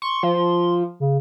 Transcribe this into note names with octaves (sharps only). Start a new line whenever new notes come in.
C6 C#6
F3
C#3